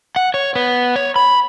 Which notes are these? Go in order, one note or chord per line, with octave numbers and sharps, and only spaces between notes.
F#5
C#5
B3
C#5
B5